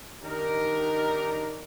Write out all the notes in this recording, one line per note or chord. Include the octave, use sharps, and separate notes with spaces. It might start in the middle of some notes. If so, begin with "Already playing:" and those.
D#3 D4 D#4 G4 A#4